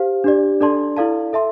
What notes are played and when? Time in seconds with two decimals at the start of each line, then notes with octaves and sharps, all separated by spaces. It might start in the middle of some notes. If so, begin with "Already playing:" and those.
Already playing: G4 C5 F5
0.24 D4 G4 D5
0.61 D4 A4 D5 A5 C6
0.97 E4 A4 D5 F5 A5
1.33 A4 E5 A5 C6